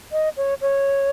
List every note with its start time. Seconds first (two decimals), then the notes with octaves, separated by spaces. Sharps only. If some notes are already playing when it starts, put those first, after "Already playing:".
0.12 D#5
0.37 C#5
0.61 C#5